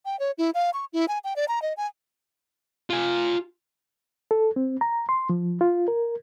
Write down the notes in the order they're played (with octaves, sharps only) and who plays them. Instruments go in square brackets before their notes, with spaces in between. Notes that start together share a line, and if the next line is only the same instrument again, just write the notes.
[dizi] G5
C#5
E4
F5
C#6
E4
G#5
G5
D5
A#5
D#5
G#5
[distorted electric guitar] F4 G#5
[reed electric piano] A4
C4
A#5
C6
F3
F4
A#4